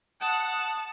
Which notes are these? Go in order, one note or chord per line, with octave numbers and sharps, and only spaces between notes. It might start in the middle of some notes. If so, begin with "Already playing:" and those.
F#5 A5 D#6